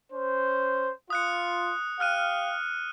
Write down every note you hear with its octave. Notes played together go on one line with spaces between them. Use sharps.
C#4 C5
F4 D#6 F#6 C#7
G4 F5 F6 F#6 D#7